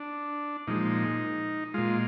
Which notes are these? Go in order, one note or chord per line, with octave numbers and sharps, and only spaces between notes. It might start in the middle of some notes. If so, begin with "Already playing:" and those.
Already playing: D4
A#2 F3 G#3 D#4
A#2 G#3 F4